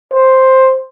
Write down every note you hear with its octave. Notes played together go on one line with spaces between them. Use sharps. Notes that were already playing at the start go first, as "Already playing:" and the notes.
C5